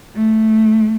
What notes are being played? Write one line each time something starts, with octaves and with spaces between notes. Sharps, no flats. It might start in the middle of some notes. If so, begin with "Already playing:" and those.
A3